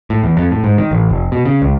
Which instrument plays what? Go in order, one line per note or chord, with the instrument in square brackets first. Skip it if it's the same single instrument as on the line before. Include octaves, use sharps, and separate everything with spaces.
[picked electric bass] A2
E2
F2
A2
G#2
D#3
A1
F1
B2
C#3
C#2